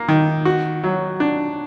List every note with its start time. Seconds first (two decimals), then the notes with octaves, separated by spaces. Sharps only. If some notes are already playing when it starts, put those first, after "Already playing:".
Already playing: A#3
0.08 D#3
0.45 F#4
0.84 F#3
1.20 D4